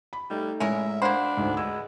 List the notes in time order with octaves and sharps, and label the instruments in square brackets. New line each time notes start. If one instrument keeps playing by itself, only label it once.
[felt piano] B5
[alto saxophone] G3 [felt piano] A3 D#4
[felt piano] A2 G#3 [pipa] C#4 E4 A#4 [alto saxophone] E5
[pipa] A#3 C5 [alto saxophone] D4 [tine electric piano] F#5 B5
[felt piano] D2 G#2
[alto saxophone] G#3 [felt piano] E6